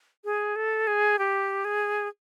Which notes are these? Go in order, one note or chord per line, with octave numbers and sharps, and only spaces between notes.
G#4
A4
G#4
G4
G#4